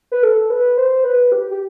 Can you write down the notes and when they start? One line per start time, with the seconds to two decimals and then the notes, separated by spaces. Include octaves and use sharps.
0.12 B4
0.23 A4
0.50 B4
0.77 C5
1.04 B4
1.32 G4
1.51 G4